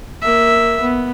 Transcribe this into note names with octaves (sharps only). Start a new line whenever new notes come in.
A#3 E5
B3